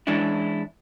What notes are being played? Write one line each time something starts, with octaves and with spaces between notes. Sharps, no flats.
E3 G#3 C#4 D4 E4